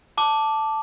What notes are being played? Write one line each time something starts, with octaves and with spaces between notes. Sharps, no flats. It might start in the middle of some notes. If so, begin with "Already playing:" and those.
A5 D6